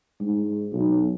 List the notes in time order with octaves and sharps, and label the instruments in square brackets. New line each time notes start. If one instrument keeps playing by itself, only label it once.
[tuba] G#2
B1